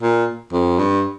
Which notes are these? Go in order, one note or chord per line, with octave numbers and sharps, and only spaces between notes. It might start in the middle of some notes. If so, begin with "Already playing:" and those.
A#2
F2
G2